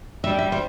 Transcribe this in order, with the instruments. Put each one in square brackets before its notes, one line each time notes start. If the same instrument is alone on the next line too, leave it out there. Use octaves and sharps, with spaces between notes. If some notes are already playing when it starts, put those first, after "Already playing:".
[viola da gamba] G3 [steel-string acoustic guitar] E5
[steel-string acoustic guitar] E5
C5